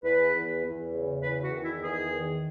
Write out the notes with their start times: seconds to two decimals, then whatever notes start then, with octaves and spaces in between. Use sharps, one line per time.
0.03 E2 B4
0.34 E2
0.64 E2
0.93 C#3
1.23 E2 B4
1.43 F#4
1.52 D#3
1.63 E4
1.82 E2 G#4
2.12 D#3